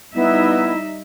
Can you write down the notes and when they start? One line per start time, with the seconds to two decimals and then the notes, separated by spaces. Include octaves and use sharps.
0.15 G3 B3 D#4 E4 E5